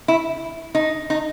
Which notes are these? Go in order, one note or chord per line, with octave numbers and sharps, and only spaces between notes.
E4
D#4
D#4